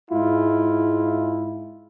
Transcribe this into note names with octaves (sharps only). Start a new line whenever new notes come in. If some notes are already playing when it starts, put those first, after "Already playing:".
G#2 G#3 E4 F4